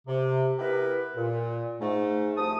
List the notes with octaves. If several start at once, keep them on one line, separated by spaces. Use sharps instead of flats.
C3
B3 E4 G4 A#4 B4
A#2
G#2 A3
C2 F3 A5 D#6